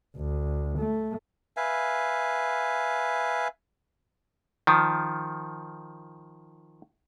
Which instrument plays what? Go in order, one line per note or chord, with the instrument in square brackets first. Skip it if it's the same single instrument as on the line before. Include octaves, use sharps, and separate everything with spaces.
[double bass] D2
A3
[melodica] B4 E5 F5 G#5
[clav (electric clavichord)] D#3 F3